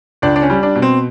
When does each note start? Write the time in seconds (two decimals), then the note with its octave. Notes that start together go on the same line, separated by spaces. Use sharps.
0.22 C#2 D4
0.36 D4
0.42 C#4
0.50 G3
0.63 D4
0.75 B2
0.82 C4